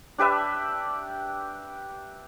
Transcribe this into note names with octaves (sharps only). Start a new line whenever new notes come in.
D4 G4 B4 E5